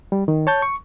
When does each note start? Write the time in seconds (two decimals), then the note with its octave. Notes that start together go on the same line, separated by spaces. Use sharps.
0.12 G3
0.28 D#3
0.47 C#5 A5 G6
0.62 C#6